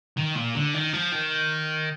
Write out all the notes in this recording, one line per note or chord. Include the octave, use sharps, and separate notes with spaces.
D#3
A#2
D3
D#3
F3
D#3